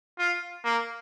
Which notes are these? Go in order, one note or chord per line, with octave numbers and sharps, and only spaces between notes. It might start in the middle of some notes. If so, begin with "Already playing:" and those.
F4
A#3